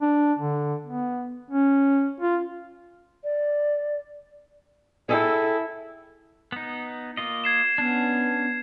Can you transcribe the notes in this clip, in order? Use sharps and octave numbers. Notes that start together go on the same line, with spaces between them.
D4
D3
B3
C#4
F4
D5
E4 G#4 A4 G5
B3 D#4
A#3 F4 D#5
G#6 C7 E7
B3 C#4 D4